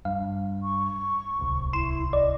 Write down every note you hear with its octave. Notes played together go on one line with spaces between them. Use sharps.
G2 F5
C#6
D1 C2
E4 C6 E7
D5 D#5